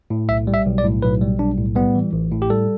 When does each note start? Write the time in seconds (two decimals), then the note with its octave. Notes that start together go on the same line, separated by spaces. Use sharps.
0.10 A2
0.29 B1 E5
0.47 G3
0.54 E5
0.66 B1
0.78 D5
0.84 A2
1.02 B1 B4
1.21 G3
1.39 B1 D4
1.58 A2
1.76 G3 B3
1.95 E3
2.13 A1
2.31 A2
2.42 G4
2.50 G3 A4